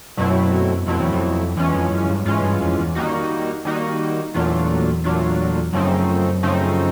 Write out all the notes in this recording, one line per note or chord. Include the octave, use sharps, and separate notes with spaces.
F#2 B2 F#3 A3 C4 E4
F2 B2 F#3 A3 C4 E4
E2
F2
E2 E3 G#3 C#4 F4
F2
F#2
G2
G#2 E3 G#3 C#4 F4
G2
F2
E2
D#3 G3 A#3 D#4 F#4
D#3 G3 A#3 D#4 F#4
E2 A#2 F#3 A3 D4 F4
A#2 F#3 A3 D4 F4
F#2 C#3 F3 A3 C4 D#4
C#3 F3 A3 C4 D#4